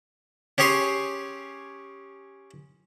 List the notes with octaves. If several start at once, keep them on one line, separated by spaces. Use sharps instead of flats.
C#4 G4 G#4 C#5 C6